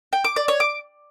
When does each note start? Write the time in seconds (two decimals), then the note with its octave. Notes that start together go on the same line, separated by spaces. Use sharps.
0.13 G5
0.25 D6
0.36 D5
0.48 C#5
0.60 D6